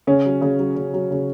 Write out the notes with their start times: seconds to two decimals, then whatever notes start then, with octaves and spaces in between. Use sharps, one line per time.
0.07 C#3 C#4
0.25 F#3
0.41 C#3
0.59 F#3
0.76 C#3
0.94 F#3
1.11 C#3